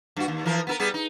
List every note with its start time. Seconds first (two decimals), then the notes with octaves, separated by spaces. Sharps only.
0.17 G2 F#4
0.28 D#2
0.46 E3 F3 A#4
0.67 B3 E4 A#4
0.80 G3 B3 G#4
0.94 D#4